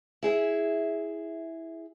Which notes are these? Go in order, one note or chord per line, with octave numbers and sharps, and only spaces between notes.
E4 G#4 E5